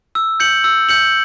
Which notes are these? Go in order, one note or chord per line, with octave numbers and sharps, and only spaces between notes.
E6
G6 C#7 F#7
E6
G6 C#7 F#7